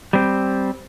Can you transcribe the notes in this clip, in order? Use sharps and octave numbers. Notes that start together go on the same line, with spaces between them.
G3 C4